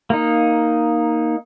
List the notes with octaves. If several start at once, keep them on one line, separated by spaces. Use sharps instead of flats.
A#3 D#4